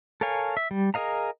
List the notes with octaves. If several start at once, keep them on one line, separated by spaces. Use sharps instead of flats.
A4 A#4 C#5 F5 G#5
E5
G3
G#4 A#4 D#5 F5 A#5